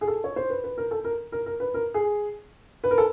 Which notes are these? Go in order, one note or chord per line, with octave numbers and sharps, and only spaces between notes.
G#4
A4
C#5
C5
B4
B4
A#4
A4
A#4
A#4
A#4
B4
A#4
G#4
B4
A#4
A4